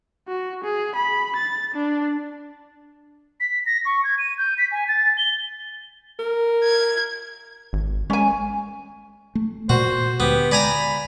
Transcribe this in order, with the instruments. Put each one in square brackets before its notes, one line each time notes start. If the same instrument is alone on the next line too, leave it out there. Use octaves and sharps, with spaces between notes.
[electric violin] F#4
G#4
B5
A6
D4
[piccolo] B6
A#6
C#6
G#6
D#7
G6
B6
G#5
A6
G7
[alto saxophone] A#4
[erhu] G#6
[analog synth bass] G#1
[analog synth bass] G#3 [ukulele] C#4 G#5
[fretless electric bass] A3
[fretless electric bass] A#2 [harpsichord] F#4 [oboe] C5
[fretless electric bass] D2 [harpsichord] B3 [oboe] G4
[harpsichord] D5 G#5 A#5 [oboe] B5